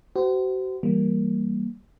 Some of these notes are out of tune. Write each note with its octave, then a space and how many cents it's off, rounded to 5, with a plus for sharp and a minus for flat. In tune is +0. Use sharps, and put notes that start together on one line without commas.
F#4 +40 C5 -30
E3 +0 G3 +0 A#3 +0